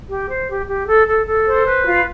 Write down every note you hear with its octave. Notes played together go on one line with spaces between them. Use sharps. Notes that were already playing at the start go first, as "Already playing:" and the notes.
G4
C5
G4
G4
A4
A4
A4
C5
B4
F4